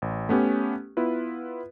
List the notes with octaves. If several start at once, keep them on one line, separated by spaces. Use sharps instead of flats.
A1
A3 B3 C#4 G4
B3 E4 F4 B4